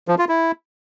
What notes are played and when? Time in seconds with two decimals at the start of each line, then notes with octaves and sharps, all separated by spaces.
0.08 F3
0.18 F4
0.29 E4